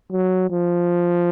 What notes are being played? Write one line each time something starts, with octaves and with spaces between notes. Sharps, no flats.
F#3
F3